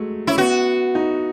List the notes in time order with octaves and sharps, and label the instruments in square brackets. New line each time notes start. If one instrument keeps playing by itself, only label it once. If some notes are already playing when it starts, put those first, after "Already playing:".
Already playing: [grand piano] F#3 G#3 A3
[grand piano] C#4 [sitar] E4
[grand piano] B3 [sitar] F#4
[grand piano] D#4